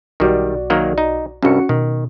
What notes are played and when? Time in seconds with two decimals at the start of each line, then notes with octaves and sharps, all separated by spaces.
0.20 B1 D#3 G3 F#4 D5
0.70 D#3 F#3 A#3
0.98 D#4
1.43 C2 G2 C#4 F#4 C#7
1.69 B2 D#3